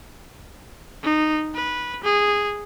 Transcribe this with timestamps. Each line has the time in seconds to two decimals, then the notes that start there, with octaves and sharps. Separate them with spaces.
1.03 D#4
1.55 B4
2.04 G#4